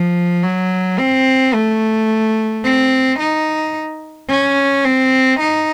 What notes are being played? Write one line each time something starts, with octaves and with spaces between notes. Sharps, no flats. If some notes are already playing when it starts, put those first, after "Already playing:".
Already playing: F3
F#3
C4
A3
C4
D#4
C#4
C4
D#4